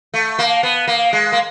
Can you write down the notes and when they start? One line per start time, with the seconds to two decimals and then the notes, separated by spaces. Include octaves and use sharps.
0.14 A3
0.39 A#3
0.63 B3
0.88 A#3
1.13 G#3
1.32 A#3